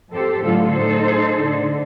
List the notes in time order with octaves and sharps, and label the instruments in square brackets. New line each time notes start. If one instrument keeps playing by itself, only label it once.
[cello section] F2 G4 A4 C5
A2 D3 F#3 A3 F4 A4
A2 D#4 A4 C5
D3